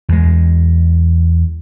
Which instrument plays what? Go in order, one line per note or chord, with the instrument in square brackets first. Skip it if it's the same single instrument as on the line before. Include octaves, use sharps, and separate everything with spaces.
[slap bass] E2 G#3